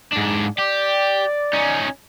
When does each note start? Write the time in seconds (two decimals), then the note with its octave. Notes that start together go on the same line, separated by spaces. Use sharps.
0.12 G#2 D4
0.58 G4 D5
1.54 C#4 D#4